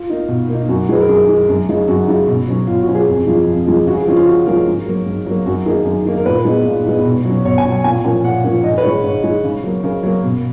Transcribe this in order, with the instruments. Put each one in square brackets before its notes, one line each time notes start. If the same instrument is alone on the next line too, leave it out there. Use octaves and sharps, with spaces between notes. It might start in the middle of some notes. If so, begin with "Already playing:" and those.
Already playing: [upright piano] F4
A#3 D#4
B2
A#3 D#4
F#2 F#4
D#3 G#3 B4
A#4
F#2 G#4
D#3 G#3
F#2
C#3 G#3 D#4
F#2 F#4
C#3 G#3 D#4
B2
F#3 C#4
B2 F4
F#4
F#3 C#4
G#4
F2
F3 G#3
F2
F3 G#3
C#3 F#4
G#4
F3 G#3 C#4 G#4
F4
C#3 F#4
F3 G#3 C#4 A#4
G#2
F#3 A#3
G#2
F#3 A#3
F#2 F#4
D#3 A#3 D#4 G#4
F#2
D#3 A#3 D#4
A#4
A#2 B4
G#3 B3 D#4
A#2
G#3 B3 D#4
B2
F#3 C#4
B2 C#5
G#5
F#3 C#4
G#5
A#2 G#5
F3 A#3 C#4 G#5
A#2 F#5
F3 A#3 C#4
G#2 D#5
B4
D#3 G#3 C#5
G#2 C#5
D#3 G#3
C#3
F#3 A#3
C#3 A#4
F#3 A#3
B2